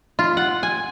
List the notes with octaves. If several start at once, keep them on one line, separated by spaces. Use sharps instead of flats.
F4
F#5
G#5